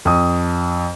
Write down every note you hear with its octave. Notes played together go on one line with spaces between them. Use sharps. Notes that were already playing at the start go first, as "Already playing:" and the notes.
F2 D#6